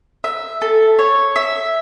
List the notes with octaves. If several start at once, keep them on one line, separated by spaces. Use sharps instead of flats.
E5
A4
C#5
E5